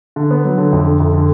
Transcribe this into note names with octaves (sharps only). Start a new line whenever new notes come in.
D3
B3
F#3
D3
F2
D3
F2
D3